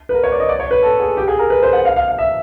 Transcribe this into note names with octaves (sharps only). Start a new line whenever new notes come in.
B4
A#4
C#5
D5
D#5
D5
C#5
B4
A4
G#4
G4
G#4
A#4
B4
C5
F#5
F5
F5
F5
E5